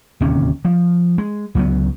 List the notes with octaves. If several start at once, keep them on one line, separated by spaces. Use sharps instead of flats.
D1 D#2 C3 C#4
F3
G#3
C#2 F#3 A3 B3